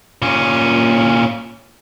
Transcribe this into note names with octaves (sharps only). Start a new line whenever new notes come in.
A#2 C#4